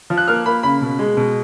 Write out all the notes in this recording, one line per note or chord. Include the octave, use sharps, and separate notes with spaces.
F3
F#6
A#3 F6
A#3 B5
C#3 B5
B2
G#3
B2